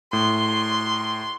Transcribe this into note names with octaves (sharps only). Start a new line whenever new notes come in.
A2 C6